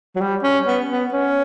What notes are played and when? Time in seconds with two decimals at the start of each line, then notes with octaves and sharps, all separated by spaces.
0.16 F#3
0.21 G3
0.43 C#4
0.67 B3
0.89 B3
1.13 C#4